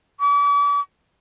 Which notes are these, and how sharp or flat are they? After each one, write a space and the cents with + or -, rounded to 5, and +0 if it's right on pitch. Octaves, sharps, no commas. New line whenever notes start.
D6 -40